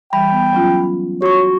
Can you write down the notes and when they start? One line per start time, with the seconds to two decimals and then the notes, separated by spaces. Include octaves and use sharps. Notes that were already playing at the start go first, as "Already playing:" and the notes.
0.13 E3 G3 G5 B5
0.32 B3
0.53 F#3 C#4 F4
1.22 F#4 C#5 C#6